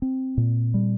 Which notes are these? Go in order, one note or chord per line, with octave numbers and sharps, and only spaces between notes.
C4
A#2
G3